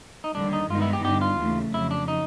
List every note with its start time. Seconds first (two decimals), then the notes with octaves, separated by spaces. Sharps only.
0.24 D#4
0.35 D#2 D3 G3 D4
0.53 D#4
0.70 G2 D#3 G#3 B3 D#4 F4
0.82 E4
0.93 G4
1.05 G2 D3 G3 G4
1.21 F4
1.39 D#2 C#3 E3 A3
1.74 F2 C#3 F#3 E4
1.91 D4
2.08 D#4